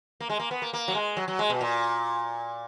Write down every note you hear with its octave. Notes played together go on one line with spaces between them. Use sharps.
A#3
G#3
A#3
B3
A#3
A#3
F#3
G#3
F#3
F#3
G#3
B2
A#2